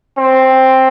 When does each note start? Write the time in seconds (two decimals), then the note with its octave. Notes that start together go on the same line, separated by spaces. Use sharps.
0.18 C4